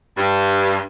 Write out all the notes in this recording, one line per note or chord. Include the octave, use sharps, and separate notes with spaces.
G2